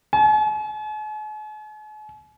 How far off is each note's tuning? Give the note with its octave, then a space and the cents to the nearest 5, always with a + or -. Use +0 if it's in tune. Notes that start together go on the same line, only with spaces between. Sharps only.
G#5 +45